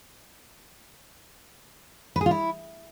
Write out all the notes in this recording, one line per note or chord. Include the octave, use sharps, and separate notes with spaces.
B4
G#4
F4
E4